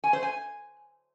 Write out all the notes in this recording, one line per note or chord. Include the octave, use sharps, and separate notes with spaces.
G#5
C5
G#5